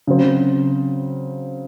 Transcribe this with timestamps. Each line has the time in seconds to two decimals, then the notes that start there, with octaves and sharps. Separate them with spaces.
0.07 C#3 F#3 C4